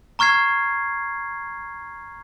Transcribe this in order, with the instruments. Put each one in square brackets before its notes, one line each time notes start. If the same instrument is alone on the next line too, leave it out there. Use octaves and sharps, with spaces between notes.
[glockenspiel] A#5 C#6 F6 G#6 C7